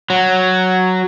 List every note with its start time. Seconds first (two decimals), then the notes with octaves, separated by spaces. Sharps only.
0.10 F#3